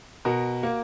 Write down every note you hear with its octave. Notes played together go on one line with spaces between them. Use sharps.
B2 F#4 A#4
A#3